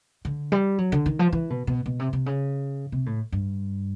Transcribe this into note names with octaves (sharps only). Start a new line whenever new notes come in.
D3
G3
F#3
D3
D#3
F3
E3
B2
B2
B2
C3
C3
C#3
C3
A2
G2